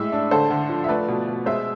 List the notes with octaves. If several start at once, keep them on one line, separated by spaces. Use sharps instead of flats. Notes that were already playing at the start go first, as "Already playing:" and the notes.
Already playing: A2 G#3 E5
D4
D3 A4 C5
D3
F3
E5
A3 B4 D5
B2
B2
G#3 C5 E5